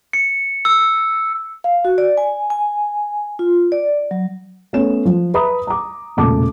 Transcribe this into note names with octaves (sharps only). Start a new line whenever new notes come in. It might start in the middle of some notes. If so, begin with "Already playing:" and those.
C#7
E6
F5
F#4
D5
G#5
G#5
F4
D5
F#3
A3 B3 C#4 C#5 E7
F3
B4 E5 A#5 B5 D#6
A#5 D6
E1 A#2 C#3 A3 A5 D6